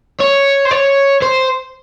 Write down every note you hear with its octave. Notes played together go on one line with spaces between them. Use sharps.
C#5
C5
C#5
C5